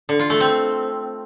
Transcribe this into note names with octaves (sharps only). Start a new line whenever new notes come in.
D3
F4
A3
C4